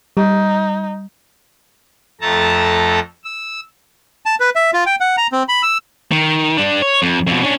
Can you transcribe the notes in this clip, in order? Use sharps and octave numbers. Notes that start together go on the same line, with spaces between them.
G3 D#4
F2 A3 A4 A5 A#5
E6
A5
B4
E5
F4
G5
F#5
A#5
C4
B5
E6
D#3
G3 D4
C#5
F2
F2 B2
C#4 D4